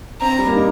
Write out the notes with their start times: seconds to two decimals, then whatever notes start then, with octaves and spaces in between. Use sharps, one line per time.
0.21 C4 A#5
0.39 G3
0.47 A#3
0.56 D#4